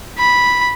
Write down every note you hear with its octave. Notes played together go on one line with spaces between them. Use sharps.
B5